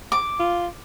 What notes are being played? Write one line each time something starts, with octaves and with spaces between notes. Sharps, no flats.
D6
F4